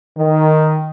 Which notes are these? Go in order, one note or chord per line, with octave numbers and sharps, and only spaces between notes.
D#3